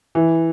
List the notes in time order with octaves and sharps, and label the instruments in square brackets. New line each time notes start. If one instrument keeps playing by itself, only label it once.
[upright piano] E3